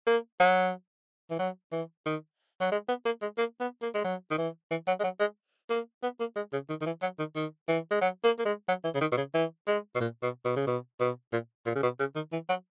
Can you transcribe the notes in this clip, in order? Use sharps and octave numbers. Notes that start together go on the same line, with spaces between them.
A#3
F#3
E3
F#3
E3
D#3
F#3
G#3
B3
A#3
G#3
A#3
B3
A#3
G#3
F#3
D#3
E3
E3
F#3
G#3
F#3
G#3
A#3
B3
A#3
G#3
C#3
D#3
D#3
E3
F#3
D#3
D#3
E3
G#3
F#3
A#3
A#3
G#3
F#3
E3
C#3
D#3
B2
C#3
E3
G#3
B2
A#2
B2
B2
C#3
B2
B2
A#2
A#2
C#3
B2
C#3
D#3
E3
F#3